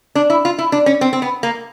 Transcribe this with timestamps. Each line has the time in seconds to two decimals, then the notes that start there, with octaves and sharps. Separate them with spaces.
0.15 D4
0.30 E4
0.45 F4
0.59 E4
0.72 D4
0.86 C#4
1.01 C4
1.13 C4
1.22 B3
1.43 A#3